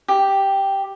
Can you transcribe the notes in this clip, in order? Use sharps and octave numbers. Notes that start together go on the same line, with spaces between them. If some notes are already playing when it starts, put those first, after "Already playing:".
G4